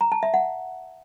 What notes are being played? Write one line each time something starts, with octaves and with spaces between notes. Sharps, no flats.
A#5
A5
E5
F#5